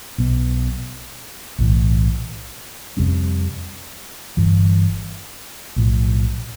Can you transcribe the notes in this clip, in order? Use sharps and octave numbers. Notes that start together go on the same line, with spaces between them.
B1 B2 B3
B1 A2 E3
F2 C3 G3 C4
G1 G2 E3
B1 A2 F3